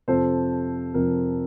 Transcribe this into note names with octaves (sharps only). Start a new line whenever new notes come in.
F2 C3 F3 A4 C5
F2 C3 F3 A#4